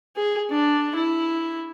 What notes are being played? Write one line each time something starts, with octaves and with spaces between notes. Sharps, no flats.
G#4
D4
E4